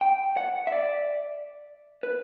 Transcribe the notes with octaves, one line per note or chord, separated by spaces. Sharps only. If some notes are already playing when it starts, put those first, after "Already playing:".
G5
F#5
E5
D5
B4